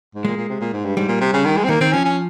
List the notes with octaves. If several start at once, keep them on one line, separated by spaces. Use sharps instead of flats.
G#2
A#2 G#3
A#2
C3
A#2
G#2
G2
G#2 G3
A#2
C3
C#3
D#3
G#3
C4
D#3 A#3
D#3 C4
F3 C#4
C#4